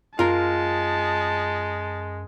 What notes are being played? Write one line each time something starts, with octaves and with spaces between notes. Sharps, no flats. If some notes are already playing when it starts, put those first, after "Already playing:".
F#2 G#3 F4 A#4 A5